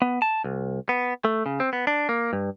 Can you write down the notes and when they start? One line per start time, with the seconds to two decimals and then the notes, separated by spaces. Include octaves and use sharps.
0.02 B3
0.22 A5
0.44 C2
0.89 B3
1.25 A3
1.46 C#3
1.60 C4
1.73 B3
1.87 D4
2.09 A#3
2.33 G2